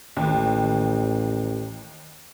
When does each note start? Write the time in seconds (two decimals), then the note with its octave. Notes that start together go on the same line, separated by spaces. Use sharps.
0.17 A1 D#2